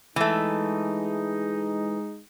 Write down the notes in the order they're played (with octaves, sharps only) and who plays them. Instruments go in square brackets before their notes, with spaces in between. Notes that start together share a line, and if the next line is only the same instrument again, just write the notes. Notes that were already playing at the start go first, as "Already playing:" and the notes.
[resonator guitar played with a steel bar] E3 A3 [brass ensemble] G#3 D#4